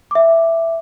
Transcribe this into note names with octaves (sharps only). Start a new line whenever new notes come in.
E5 D6